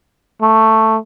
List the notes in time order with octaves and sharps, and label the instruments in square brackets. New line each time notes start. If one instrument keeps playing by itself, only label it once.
[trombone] A3